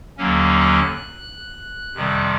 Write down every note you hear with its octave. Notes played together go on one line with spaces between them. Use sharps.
D#2 D3 F#3 A#3 C#4
F#6
F2 C3 D#3 G3